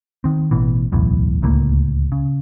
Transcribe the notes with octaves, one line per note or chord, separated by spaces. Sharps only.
D#3 C4
A1 B2 E3
D1 B1 E2 A2
D1 C#2 A2 A#3
C#3